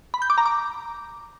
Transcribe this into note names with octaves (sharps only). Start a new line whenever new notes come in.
B5
G6
D6
A#5
D6